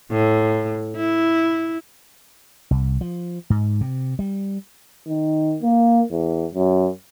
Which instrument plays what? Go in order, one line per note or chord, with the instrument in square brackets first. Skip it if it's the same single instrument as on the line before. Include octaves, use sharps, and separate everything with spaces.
[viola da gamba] A2
E4
[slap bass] C2
F3
G#2
C3
G3
[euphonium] D#3
A#3
E2
F#2